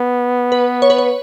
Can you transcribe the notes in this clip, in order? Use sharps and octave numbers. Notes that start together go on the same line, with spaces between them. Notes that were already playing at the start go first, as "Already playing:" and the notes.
Already playing: B3
B4
C#5
B4
C#5